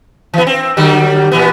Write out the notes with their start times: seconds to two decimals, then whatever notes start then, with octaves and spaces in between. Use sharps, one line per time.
0.34 E3 B3
0.47 C4
0.77 D3 F#3 G3
1.32 A#2 E3 B3